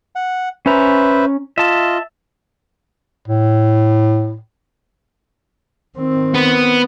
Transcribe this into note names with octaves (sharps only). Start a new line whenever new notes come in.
F#5
C#4 B4 C5 E5 A#5
F4 D#5 E5 A5
A2
D#3 C4
B3